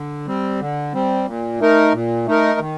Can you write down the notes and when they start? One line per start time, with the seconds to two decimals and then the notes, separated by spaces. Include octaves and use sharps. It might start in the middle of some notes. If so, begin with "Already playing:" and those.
Already playing: D3
0.27 G3 C4
0.60 D3
0.93 G3 C4
1.27 A#2
1.60 A3 D#4 A#4
1.93 A#2
2.26 A3 D#4 A#4
2.59 D#3